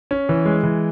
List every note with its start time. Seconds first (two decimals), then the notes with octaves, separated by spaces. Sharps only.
0.11 C#4
0.29 E3
0.46 G#3
0.63 E3